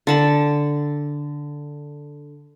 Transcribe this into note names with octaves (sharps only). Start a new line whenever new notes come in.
D3 A5 B5